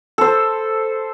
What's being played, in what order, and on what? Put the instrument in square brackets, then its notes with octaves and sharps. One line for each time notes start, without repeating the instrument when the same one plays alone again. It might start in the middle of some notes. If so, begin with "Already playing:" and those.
[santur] A4 C5